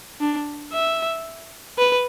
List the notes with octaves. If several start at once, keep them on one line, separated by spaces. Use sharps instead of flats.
D4
E5
B4